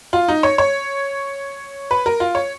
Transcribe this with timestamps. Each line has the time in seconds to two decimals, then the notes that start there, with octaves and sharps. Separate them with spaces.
0.13 F4
0.28 D#4
0.43 C#5
0.58 C#5
1.91 B4
2.06 A#4
2.20 F4
2.35 C#5